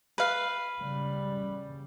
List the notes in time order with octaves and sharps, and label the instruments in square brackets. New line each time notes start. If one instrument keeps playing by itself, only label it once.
[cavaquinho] B4 F5
[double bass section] C#3 G3